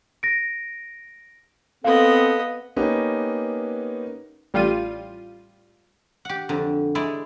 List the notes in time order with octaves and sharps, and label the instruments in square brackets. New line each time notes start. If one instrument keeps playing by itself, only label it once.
[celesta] A#6 D7
[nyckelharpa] B3 D#5 [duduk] C4 [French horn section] A4 [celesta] F5
[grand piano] A#3 B3 C#4 D#4 G4 B4
[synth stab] A1 G3 F4 D#7
[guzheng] G4 F#5
F2 D3
G#3 E4 D5